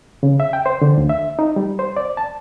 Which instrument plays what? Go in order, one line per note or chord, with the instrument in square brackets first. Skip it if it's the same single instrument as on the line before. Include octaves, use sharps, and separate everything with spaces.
[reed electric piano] C#3
E5
G5
C5
D3
D2
E5
D#4
G3
C5
D5
A5